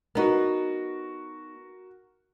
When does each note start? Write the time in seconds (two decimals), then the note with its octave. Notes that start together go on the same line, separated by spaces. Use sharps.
0.15 B3 D#4 F#4 A#4